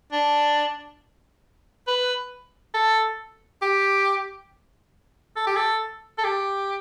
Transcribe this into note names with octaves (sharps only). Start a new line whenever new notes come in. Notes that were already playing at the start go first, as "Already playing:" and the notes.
D4
B4
A4
G4
A4
G4
A4
A4
G4